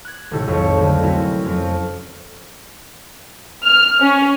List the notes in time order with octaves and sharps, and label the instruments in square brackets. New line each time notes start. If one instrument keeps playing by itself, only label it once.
[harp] F#6 G#6
G#1 A2 C3 A4
B1 F2 C#5 C#6 C#7
D2 D3
A3 C4 C#4 E4 F#4 A#4
F2 F3 C#4
[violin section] F6
C#4